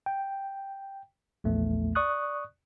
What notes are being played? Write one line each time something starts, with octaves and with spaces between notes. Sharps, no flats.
G5
A#1 E2 A3
D5 C#6 D#6 F#6